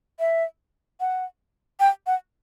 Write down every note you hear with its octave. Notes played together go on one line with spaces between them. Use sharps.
E5
F#5
G5
F#5